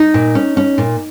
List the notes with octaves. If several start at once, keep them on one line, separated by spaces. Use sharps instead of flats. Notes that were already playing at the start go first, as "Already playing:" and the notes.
Already playing: D#4
A#2
C#4
C#4
A#2